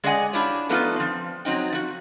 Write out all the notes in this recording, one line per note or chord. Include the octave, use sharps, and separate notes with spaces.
G#3 G#4 D5 D#5 F#5 G#5
D4 E4 F4 G4 C#5
F3 A3 B3 D4 D#4 F4
F3 C4
F#3 C4 D#4 G5
F3 F#4